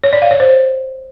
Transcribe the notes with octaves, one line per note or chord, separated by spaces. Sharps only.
C#5
D5
F5
C#5
C5